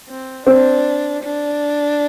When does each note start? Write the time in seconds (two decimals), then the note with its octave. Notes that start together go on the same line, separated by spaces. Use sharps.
0.09 C4
0.47 C4 D4
1.24 D4